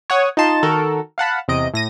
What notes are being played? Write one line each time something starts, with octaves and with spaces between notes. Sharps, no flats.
C#5 F#5 D#6
D#4 F4 D#5 A5 C6
D#3 F#4 A4 A#4
F5 F#5 A5 B5
E2 C3 D#5 D7
A2 A#6 D#7